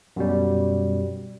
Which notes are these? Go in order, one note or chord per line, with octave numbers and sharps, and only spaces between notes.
F#2 B2 G3